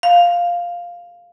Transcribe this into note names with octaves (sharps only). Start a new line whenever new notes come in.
F5